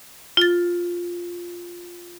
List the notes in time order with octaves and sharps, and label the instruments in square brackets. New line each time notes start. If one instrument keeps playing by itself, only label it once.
[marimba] F4 A6